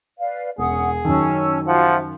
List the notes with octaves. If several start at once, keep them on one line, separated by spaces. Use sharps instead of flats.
B4 D5 F5
E1 C#4 G#4 F#5 D#6
F#2 D#3 C#4 A5 E6
F3 F4 F#4 E5 F#5